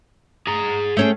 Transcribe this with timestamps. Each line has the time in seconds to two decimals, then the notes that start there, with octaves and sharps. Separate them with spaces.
0.47 G#4 A#5
0.97 A3 C#4 G#4 G5